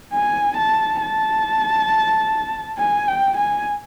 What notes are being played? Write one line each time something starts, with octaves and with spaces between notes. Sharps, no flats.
G#5
A5
A5
G#5
G5
G#5